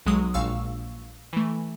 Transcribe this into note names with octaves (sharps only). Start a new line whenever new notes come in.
B1 F#3 G#3 D#6
A#1 A#2 F5 C#6 E6
E3 A3